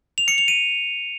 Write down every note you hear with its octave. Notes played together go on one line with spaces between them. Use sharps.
F7
C#7
F7
D#7